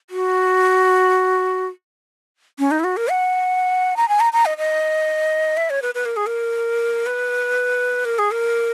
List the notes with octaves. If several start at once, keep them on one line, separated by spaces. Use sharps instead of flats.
F#4
C#4
D#4
E4
F#4
A#4
F#5
A#5
G#5
A#5
A#5
D#5
D#5
E5
C#5
B4
B4
A#4
G#4
A#4
B4
A#4
G#4
A#4